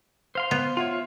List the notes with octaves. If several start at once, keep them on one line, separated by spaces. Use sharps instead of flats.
C5 F5 C6
B3
F4 C#5 E5 F#5